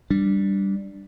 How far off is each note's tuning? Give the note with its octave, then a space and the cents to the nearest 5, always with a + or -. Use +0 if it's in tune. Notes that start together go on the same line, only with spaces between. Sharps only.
G3 +0 D4 +0